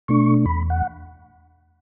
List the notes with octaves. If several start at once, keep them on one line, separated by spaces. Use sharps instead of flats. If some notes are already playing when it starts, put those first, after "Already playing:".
B2 A3 D4 C#6
E2 B5
F#5